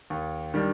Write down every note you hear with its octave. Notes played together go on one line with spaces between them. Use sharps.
D#2
D#3 G3 D4